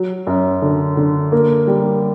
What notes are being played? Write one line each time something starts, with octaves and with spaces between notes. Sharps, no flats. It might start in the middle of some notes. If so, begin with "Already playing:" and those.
Already playing: F#3
F#2
D3
D3
A#3
G3